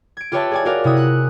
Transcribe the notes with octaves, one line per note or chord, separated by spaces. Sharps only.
G#6 D7
F4 G4 B4 C#5 E5 A5
G#4 D5 G#5
F4 F#4 A#4 D5 F5
C3 E4 F#4 D#6
F#6